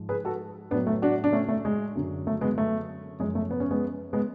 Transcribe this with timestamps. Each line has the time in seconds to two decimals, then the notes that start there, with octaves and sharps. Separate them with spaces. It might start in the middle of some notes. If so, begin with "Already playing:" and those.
Already playing: G#2 F3
0.09 G#4 B4
0.25 F#4 A4
0.71 A2 F#3 B3 D4
0.87 A3
1.02 D4 F#4
1.24 D4
1.33 A3 C#4
1.48 A3
1.65 G#3
1.96 F#2 D3 F#3
2.27 A3
2.41 G#3 B3
2.58 A3
3.19 F#2 F3 G#3
3.35 A3
3.51 B3
3.60 C#4
3.71 G#3 B3
4.13 G#3 B3